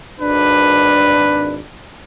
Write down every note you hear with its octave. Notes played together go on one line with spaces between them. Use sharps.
G#1 D4 B4